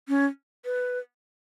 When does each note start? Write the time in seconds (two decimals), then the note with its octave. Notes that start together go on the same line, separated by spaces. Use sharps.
0.08 C#4
0.65 B4